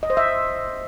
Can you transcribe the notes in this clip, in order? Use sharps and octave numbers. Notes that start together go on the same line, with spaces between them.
D#5
C5
E5